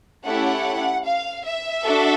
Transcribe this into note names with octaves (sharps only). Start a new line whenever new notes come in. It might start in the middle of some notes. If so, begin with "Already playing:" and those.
A3 C#4 E4 G4 F#5
F5
E5
D4 F#4 A4